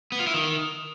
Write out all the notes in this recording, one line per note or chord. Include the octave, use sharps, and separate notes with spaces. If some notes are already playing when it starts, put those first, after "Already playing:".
B3
F4
E4
D#3